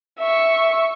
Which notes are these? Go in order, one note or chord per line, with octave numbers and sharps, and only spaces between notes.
E5 C#6